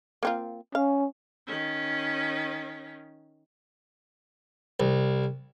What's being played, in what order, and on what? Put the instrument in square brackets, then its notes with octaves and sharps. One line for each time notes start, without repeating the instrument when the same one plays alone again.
[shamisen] A#3 C4 F4
[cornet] C#4 [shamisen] F5
[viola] D#3 C#4
[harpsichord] C2